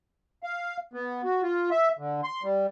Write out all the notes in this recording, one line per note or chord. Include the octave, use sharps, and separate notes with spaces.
F5
B3
F#4
F4
E5
D3
C6
G3